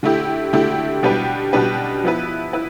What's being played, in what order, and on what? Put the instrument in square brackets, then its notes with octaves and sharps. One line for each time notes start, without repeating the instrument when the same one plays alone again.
[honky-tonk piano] D3 A3 E4 G4
D3 A3 E4 G4
B2 G3 D4 G4 B4
B2 G3 D4 G4 B4
F3 B3 E4 B4
E4 B4